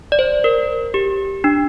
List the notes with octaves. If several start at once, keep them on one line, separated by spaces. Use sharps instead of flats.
D5
C5
A#4
G4
D4